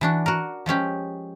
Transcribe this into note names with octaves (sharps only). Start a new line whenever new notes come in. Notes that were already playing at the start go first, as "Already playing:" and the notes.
E3 D4 F#4
F#4 A#4
F3 G#3 C#4 G4